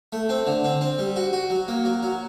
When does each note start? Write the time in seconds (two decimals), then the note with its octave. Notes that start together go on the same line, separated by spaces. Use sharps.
0.13 A3
0.29 C4
0.47 D3
0.64 C4
0.81 C4
0.99 G3
1.16 F#4
1.33 F#4
1.50 F#3
1.68 A#3
1.85 F#3
2.03 F#3